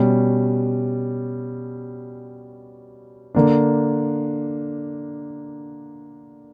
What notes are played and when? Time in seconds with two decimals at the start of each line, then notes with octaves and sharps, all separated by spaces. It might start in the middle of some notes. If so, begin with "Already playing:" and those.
Already playing: B2 G3 C#4
3.35 D3 A#3 D4